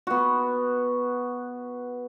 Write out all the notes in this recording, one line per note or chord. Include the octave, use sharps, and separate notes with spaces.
B3 F#4